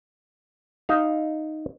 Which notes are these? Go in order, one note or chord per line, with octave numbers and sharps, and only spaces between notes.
D#4 F5